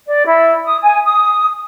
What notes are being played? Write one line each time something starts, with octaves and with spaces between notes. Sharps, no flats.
D5
E4
D#6
G#5
D#6